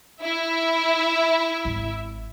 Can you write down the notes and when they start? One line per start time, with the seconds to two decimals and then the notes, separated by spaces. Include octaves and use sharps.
0.21 E4 E5
1.65 G#1